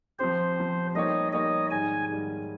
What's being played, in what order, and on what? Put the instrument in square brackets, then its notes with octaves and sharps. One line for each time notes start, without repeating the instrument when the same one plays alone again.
[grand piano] F3 C4 G4 [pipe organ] C5
[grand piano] F3 C4 G4
[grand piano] G3 A#3 D#4 G4 C#5 [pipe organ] D#5
[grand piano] G3 A#3 D#4 G4 C#5 [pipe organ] D#5
[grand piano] G#2 D#3 G3 [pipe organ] G#5
[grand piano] G#2 D#3 G3